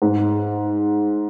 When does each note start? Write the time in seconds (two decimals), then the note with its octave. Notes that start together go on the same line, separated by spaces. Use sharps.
0.02 G#2